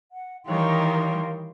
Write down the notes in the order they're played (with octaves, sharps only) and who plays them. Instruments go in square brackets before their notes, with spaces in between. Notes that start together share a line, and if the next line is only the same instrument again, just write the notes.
[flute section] F#5
[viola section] D#3 A#4 C#5 [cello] E3 G3 [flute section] F5 G5 C6